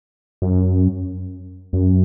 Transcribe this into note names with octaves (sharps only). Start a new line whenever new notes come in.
F#2
F#2